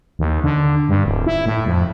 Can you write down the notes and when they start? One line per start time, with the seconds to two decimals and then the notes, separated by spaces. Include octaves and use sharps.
0.19 D#2
0.44 D3
0.89 G2
1.05 D1
1.26 E4
1.46 A2
1.66 F2